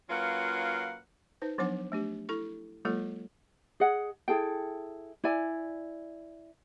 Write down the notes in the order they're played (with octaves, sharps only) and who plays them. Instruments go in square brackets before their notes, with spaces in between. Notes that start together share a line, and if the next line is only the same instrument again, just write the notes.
[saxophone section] F#3 A#3 C#4 F4 B4 F#5
[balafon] D#4 B4 C5
F3 F#3 B3 D4 F#5 D6
A3 D4 G4
E4 A4 C#6
F#3 G#3 A#3 F4 A4
[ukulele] G#4 D#5 F#5
E4 G#4 A4 G5
E4 D5 G#5